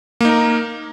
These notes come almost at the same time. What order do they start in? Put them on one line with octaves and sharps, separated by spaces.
A#3 D#4 A#4